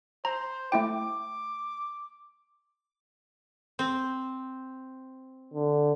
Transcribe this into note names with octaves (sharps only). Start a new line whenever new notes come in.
C5 A#5
A3 E4 G5 D6
C4
D3